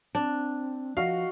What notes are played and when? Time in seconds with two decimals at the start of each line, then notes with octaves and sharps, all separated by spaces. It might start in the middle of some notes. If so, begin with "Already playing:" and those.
0.15 C4 D4
0.97 F3 F#4 D#5 F5